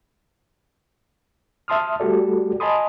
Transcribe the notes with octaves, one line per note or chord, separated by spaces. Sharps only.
E5 A5 C6 D#6 F6
G3 A3 F#4 G4 A4 D5
D#5 G#5 A5 B5 C6 D#6